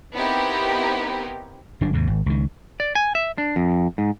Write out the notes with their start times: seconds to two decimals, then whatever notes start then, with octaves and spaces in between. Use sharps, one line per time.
0.13 B3 C4 D#4 E4 G4 A#4
1.81 G1 F#3 D4
1.93 D#2 G#2 C3
2.07 G#1
2.26 C#2 D#3
2.80 D5
2.95 G#5
3.15 E5
3.38 D4
3.56 F2
3.98 G#2